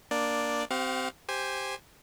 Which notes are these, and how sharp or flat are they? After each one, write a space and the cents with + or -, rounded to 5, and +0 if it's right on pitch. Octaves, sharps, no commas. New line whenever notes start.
A#3 +5 D4 +0 D5 +0
C4 -15 G4 -40 F5 +25
G4 +0 C5 +0 G#5 -10